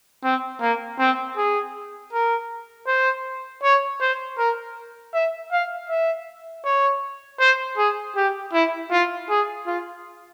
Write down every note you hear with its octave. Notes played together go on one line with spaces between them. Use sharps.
C4
A#3
C4
G#4
A#4
C5
C#5
C5
A#4
E5
F5
E5
C#5
C5
G#4
G4
E4
F4
G#4
F4